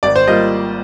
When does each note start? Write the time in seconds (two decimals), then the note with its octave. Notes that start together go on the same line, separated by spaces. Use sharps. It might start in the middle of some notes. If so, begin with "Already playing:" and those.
0.03 G#1 D5
0.16 C5
0.27 G3 A#3 F4 D#5